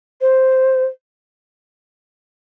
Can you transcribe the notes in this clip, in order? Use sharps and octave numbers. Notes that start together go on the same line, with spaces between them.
C5